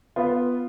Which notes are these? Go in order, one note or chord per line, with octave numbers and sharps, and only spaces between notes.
B3 F4